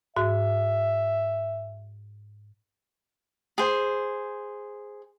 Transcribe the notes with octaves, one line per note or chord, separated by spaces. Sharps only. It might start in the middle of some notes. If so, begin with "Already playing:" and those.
G#2 F#4 E5
G#4 C5